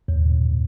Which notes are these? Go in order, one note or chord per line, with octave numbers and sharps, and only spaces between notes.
D#2